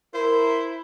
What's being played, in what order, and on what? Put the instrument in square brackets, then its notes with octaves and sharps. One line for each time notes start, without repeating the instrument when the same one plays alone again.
[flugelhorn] E4 [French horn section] A#4 [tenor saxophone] C5